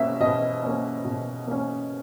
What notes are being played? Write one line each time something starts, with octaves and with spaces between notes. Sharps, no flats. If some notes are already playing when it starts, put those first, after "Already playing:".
Already playing: B2 A#3 C#4 E5
B2 D#5
A#3 C#4
B2
A#3 C#4